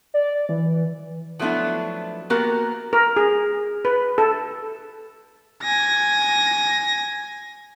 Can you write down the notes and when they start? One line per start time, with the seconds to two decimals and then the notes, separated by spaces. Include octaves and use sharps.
0.14 D5
0.49 E3
1.39 F3 F#3 A3 B3 D4 E4
2.30 A#3 B3 F#4 G4 A#4
2.93 A#4
3.16 G#4
3.85 B4
4.18 A4
5.62 G#5 A#6